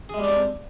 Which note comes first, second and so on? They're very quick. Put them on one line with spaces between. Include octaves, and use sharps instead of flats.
G#4 G#3 G3 D4 C4